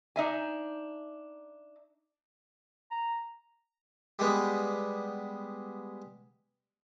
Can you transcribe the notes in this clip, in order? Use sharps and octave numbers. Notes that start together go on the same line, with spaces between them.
D4 D#4 E5 G#5
A#5
G3 G#3 B3